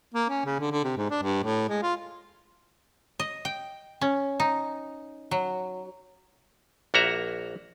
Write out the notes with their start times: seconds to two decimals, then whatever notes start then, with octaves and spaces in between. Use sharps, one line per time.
0.14 A#3
0.29 C#4
0.45 C#3
0.60 D3
0.71 D3
0.84 C3
0.97 G#2
1.10 D4
1.22 G2
1.44 A2
1.69 G#3
1.82 F4
3.20 D#5
3.45 G5
4.01 C#4
4.40 D#4
5.31 F#3
6.94 A#1 A#3 F#4 E5 A#5